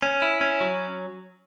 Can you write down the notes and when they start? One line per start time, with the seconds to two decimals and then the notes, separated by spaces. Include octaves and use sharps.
0.02 C#4
0.22 E4
0.41 C#4
0.61 F#3